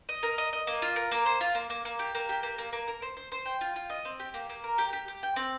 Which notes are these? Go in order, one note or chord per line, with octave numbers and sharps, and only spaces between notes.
D#5
A#4
D#5
D#5
A#3
F4
A#4
A#3
C5
F4
A#3
A#3
A#3
G4
A#3
G4
A#3
A#3
A#3
A#4
C5
C5
C5
G5
F4
F4
D#5
C4
G4
A#3
A#3
A#4
G4
G4
G4
G5
C4